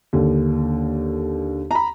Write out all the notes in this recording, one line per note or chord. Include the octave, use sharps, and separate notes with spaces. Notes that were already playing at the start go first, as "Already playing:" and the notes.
D#2 D3
A#5 B5